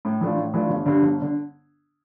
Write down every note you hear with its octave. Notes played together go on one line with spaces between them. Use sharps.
A2
E3 A3 D4 F4
A2
E3 A3 D4 F4
G1
G2 D3
G1
D3